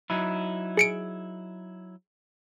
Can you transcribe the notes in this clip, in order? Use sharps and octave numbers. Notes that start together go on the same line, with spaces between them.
F#3 D#4 E4
G#4 C#7 D7